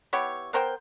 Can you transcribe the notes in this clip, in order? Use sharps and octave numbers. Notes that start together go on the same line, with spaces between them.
B3 E4 G4 C#5
B3 A#4 C5 G5